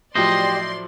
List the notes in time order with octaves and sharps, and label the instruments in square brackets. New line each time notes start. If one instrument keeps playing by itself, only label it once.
[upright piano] A2 F3 F#3 [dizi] G4 [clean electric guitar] C5 D#5 [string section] D5 C6